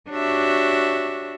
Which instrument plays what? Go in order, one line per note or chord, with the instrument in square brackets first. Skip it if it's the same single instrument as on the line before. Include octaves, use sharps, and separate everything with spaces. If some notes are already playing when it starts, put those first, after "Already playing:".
[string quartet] D4 F#4 G4 C#5 E5